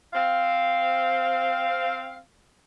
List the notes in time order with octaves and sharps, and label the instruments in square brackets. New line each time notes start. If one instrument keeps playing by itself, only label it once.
[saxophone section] C4 F5